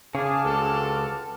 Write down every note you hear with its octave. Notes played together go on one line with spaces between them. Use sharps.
C#3 G#4 A5 D6 F6
C#2 C4 F#4 A4